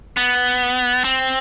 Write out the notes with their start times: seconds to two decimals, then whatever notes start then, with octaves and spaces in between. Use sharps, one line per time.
0.17 B3
1.04 C4